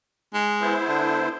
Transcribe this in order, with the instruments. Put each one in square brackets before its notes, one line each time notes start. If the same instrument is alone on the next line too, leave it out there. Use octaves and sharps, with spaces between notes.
[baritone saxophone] G#3
[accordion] B3 E4 C5
[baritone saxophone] D3